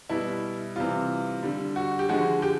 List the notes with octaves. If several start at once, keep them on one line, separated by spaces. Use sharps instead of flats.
B2 G3 E4
C3 E3 G3 F4
D3 G3
F#4
G4
D3 F3 G#3 F#4
G4